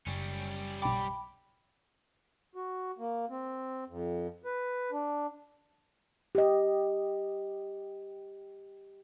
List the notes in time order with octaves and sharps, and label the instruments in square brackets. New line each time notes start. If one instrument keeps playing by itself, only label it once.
[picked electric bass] F#1 [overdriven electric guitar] G3 C#4
[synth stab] B1 D6 [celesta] G5 B5
[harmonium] F#4
A#3
C4
F2
B4
D4
[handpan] G4 D#5